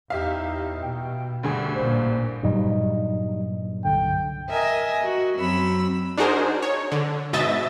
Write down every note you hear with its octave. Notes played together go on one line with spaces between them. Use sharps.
E2 D#4 G4 E5 F5
B2 G5
D2 G2 D3 G#4
A1 A#2 C5
G2 A#2 F#3 G3 D#4 D#5
C2 D3 G5
A#4 D#5 E5 G#5
F#4
F#2 F#3 C4 B5 E6
D4 D#4 F#4 G#4 A#4 C5
C#5
D3
G#2 B2 D#5 E5 A6